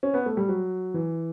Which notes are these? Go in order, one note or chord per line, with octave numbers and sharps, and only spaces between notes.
C#4
B3
A3
G3
F#3
E3